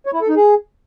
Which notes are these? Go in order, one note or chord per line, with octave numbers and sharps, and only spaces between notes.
C#5
E4
A4
D#4
G#4